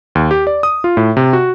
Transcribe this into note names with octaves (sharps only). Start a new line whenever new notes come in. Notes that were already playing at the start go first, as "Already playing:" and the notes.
D#2
G4
D5
D#6
F4
A2
C3
F#4